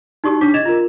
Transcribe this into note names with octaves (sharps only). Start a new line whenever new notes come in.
D#4 F#4 G4 D5 C#6 D#6
D4 C#5 D6 B6
D#5 G#6 A6 E7 F7
F4 A#4